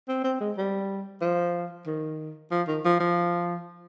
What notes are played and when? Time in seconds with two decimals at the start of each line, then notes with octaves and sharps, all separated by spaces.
0.08 C4
0.24 C4
0.41 G#3
0.57 G3
1.21 F3
1.87 D#3
2.51 F3
2.67 D#3
2.85 F3
3.00 F3